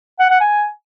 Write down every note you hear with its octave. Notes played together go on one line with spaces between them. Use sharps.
F#5
F#5
G#5